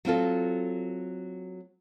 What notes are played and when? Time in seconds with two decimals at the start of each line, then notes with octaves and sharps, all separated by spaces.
0.05 F#3 C4 F4 A4